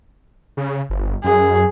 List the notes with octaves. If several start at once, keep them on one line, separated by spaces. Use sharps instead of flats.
C#3
G1
F#2 G#4